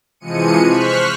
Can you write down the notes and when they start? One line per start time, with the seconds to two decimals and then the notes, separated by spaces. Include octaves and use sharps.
0.20 C3 E3 F3 G#3 C#7 D#7
0.69 C5 C#6 F6 F#6 B6